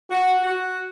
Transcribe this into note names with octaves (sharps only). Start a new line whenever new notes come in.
F#4
F#4